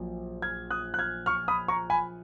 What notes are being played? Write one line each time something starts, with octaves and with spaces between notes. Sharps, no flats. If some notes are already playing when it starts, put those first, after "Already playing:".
Already playing: A#1 A#2 F#3
F6 G#6
D#6 F#6
F#6
F6 G#6
C#6 F6
B5 D#6
A#5 C#6
G#5 B5